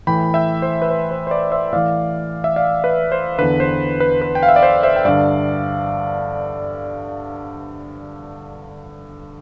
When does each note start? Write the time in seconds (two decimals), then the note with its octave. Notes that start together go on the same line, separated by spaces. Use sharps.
0.07 A2 E3 G5 B5
0.34 E5 G5
0.62 C5
0.82 B4
0.89 C5
1.11 C5
1.27 C5
1.31 B4 D5
1.51 C5 E5
1.73 A2 E3 D5 F5
2.44 E5
2.56 D5 F5
2.84 B4
3.12 C5
3.39 E2 D3 B4
3.60 C5
4.00 B4
4.22 B4
4.35 G5
4.43 F5
4.49 E5
4.56 D5
4.63 C5
4.83 C5 E5
4.96 G5
5.05 G2 D3 D5 F5